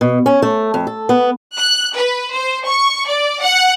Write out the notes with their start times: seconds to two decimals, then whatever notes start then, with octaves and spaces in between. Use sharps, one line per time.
0.01 B2
0.26 C#4
0.42 A3
0.74 F2
0.87 A4
1.09 B3
1.58 F#6
1.95 B4
2.34 C5
2.68 C#6
3.08 D5
3.43 F#5